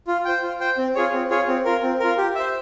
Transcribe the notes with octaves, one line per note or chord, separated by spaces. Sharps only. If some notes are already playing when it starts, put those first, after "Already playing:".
F4
C5 G5
F4
C5 G5
C4
F4 G#4 C#5
C4
F4 G#4 C#5
C4
F4 A#4
C4
F4 A#4
G4
C5 E5